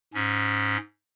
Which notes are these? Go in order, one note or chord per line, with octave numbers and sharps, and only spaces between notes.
G#2 C#4